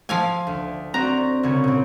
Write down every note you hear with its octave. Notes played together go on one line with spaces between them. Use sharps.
F3 F5 G#5
D2
C4 F#4 D5 A#5
C2 C#3 C#5
A#2 C4